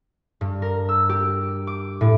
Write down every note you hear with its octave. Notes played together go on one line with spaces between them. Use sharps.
G2
A#4
E6
G4
D6
A2